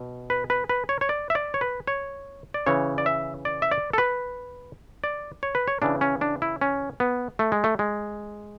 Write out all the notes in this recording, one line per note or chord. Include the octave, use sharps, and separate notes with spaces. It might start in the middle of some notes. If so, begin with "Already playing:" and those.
Already playing: B2
B4
B4
B4
C#5
C#5
D5
E5
D5
C#5
B4
C#5
D5
C#3 E3 C#5
D5
E5
D5
E5
D5
A4
B4
D5
C#5
B4
C#5
C#3 E3 D4
C#4
D4
E4
C#4
B3
A3
G#3
A3
G#3